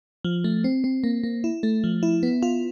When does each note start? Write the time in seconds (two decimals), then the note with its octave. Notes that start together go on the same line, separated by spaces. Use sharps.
0.24 F3
0.44 A3
0.64 C4
0.84 C4
1.04 A#3
1.24 A#3
1.44 E4
1.63 A3
1.84 F3
2.03 E4
2.23 B3
2.43 F4